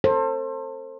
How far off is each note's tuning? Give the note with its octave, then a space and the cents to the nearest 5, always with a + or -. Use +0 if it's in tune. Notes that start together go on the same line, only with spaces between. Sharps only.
A4 +35 C5 +30